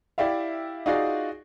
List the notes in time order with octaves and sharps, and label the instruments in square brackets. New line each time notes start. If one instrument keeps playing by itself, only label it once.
[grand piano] E4 G4 D5 E5 F5
D#4 F4 F#4 G#4 D5